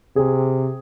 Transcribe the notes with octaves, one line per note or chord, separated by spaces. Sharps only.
C3 G#4